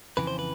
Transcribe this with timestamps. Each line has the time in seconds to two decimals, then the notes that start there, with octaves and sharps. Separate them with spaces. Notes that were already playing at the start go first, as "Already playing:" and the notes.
0.17 F2 C#3 E3 B4
0.27 C5
0.39 B4